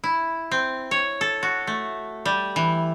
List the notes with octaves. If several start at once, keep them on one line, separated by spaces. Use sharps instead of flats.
E4
C4
C#5
A4
F#4
A3
G3
E3